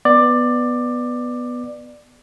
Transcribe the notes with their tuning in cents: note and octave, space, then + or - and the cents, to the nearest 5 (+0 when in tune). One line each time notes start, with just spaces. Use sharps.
B3 +0 D5 +15